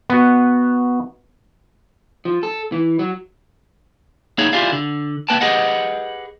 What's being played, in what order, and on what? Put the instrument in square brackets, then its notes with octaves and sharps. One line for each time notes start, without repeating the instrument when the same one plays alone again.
[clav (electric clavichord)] B3 F#4
[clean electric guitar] F3
A4
E3
F#3
A#3 D#4 E4 G#4 C#5
E4 F4 G4 G#4 D5 F5
D3
A#3 B4 G5 A5
G4 G#4 B4 D#5 F#5